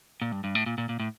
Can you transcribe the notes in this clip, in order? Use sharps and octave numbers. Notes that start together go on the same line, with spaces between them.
A#2
G2
G2
A2
A#2
A#2
A#2
A2